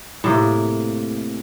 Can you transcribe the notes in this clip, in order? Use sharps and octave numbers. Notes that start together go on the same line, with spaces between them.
A2 C3 A#3